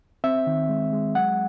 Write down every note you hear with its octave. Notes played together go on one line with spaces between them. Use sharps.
C4 E5
D#3
G#3
G#3
F#3 F#5